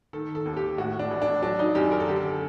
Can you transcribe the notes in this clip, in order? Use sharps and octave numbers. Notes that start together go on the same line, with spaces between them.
D#3 A4
A4
D#2
G4
A2 F#4
D4
A1
D4
F#3 D4
D#4
F#2 G4
A#4
A4
D3 G4
A4